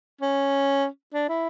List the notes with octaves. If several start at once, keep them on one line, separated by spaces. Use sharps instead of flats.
C#4
D4
E4